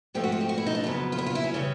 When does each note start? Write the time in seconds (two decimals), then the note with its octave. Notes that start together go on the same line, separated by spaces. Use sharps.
0.14 G#2 F3 A3 C4 G4
0.24 F#4
0.32 F4
0.41 G4
0.49 F#4
0.58 E4
0.66 D#4
0.75 D4
0.84 F2 C#3 F#3 B3
1.12 F4
1.18 E4
1.26 F4
1.35 E4
1.44 C#4
1.54 C#3 E3 G3